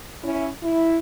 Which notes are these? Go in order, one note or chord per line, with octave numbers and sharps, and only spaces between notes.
C#4 E4
E4